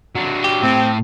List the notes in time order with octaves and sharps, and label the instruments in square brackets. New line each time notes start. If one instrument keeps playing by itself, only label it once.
[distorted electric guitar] F#3 D4
[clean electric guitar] G4
[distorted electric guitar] A2 [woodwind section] C4